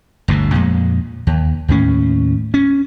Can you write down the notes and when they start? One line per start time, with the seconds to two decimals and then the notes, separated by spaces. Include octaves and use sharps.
0.28 G1 D2 B2 D3
0.54 F2 A#2 G#3
1.27 D#2
1.68 D#2 A2 C#4
2.54 C#4